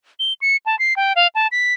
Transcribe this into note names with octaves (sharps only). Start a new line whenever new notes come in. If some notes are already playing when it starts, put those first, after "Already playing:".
G7
C#7
A5
C7
G5
F5
A5
B6